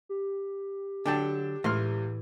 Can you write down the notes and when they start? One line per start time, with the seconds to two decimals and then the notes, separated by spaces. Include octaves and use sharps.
0.09 G4
1.06 D3 F#3 D4 G5 A5
1.64 C#2 A2 E3 C6 F6